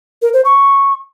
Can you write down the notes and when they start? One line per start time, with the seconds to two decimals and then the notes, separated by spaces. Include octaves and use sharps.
0.22 A#4
0.33 C5
0.45 C#6